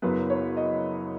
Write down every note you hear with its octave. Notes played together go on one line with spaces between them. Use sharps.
F#1 F#2 F#3 B3 B4
C#5
D#5